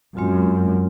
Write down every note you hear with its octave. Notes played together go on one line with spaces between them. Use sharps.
F#2 G#3 C4 F4